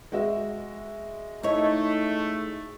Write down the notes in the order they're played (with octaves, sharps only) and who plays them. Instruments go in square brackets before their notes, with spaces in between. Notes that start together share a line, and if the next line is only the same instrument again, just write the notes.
[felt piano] G#3 F#4 E5
[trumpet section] A3 [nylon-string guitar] D#4 E4 C#5